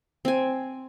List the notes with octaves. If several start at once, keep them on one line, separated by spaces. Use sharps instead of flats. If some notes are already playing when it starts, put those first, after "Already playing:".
C4 G#5